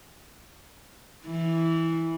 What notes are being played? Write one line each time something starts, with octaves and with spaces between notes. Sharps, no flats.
E3